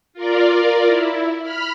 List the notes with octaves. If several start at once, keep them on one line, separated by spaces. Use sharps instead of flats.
F4 A#4 D5
E4
B5 F6